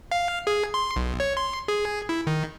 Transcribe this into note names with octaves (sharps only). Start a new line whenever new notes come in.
F5
G#4
C6
B1
C#5
C6
G#4
E4
D#3